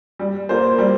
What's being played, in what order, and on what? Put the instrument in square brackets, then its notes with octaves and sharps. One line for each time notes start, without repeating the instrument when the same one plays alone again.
[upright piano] G3
A#3 F4 C5
G3